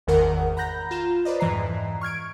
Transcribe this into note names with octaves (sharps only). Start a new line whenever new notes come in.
G#1 E2 D#3 A#4 F#5
A#5 B5 F#6 G6 A#6
F4 A#5 E7
B4 C5 D5 D#5
F2 G#2 E3 D#5 A#5 C7
C#6 F6 G#6 D7